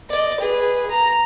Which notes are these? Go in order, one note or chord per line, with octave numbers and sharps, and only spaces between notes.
D5 D#5
G#4 B4
A#5